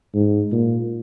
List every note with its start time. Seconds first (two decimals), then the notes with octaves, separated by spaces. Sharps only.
0.15 G#2
0.52 A#2